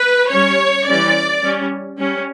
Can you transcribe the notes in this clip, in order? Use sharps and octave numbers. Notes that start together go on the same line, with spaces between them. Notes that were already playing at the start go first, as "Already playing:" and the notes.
Already playing: B4
G3 C#4 C#5
E3 G3 C#4 D5
G3 C#4
G3 C#4